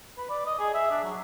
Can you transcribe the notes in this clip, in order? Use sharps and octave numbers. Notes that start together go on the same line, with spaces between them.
B4
D5
D#5
G#4
E5
D4
F#3